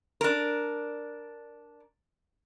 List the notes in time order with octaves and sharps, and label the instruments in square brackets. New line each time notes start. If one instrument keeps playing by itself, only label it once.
[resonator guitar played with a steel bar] D4 A#4